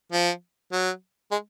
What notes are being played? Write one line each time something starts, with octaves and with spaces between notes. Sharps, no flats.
F3
F#3
G#3